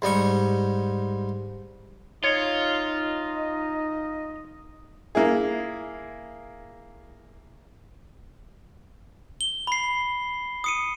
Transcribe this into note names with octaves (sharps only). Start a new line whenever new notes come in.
G#2 G3 D#5 C#6
D#4 F4 C#5 D#5
A#3 E4 G#4
G7
B5 C7
D#6 C#7 D#7